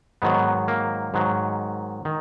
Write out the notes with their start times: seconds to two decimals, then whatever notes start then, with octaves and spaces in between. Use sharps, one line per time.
0.22 G#2 D#3 F#3 B3
0.68 A#3
1.14 G#2 D#3 F#3
2.05 D#3